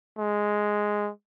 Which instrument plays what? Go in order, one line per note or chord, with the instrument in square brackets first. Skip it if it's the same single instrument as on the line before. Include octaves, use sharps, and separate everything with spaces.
[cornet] G#3